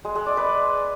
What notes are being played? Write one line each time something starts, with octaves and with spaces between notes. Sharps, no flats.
G#3
G#3
D5
B4